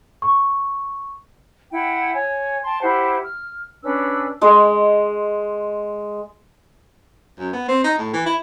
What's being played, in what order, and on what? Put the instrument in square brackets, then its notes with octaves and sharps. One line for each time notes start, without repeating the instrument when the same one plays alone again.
[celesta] C#6
[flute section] E4 F#5 G5
C#5 G#5
G5 A5 C6
E4 G4 C5 F#5
F6
C#4 D4 B4 E6
[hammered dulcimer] G#3 D#5
[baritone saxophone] F#2
B3
C4
D#4
A2
E3
E4